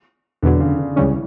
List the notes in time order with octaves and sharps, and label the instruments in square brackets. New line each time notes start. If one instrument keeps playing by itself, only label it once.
[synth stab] E2 B2 F#3 [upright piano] D3
[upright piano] C#3
D3
[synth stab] C#2 C#3 G3 C#4 [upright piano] E3